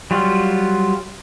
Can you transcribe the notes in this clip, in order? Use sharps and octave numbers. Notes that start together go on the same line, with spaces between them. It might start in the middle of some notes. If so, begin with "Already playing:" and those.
F#3 G3 F4